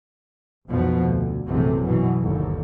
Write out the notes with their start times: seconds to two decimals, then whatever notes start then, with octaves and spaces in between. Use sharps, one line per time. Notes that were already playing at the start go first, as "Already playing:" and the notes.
0.68 F1 B1 B2 F3 B3
1.03 D2
1.46 A#1 F#2 C3 E3 A3
1.82 B2 E3 F#3
2.17 G1 D#2